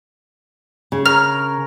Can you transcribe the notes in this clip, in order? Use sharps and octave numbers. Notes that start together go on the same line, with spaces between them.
C#3
A#4 C#5 F6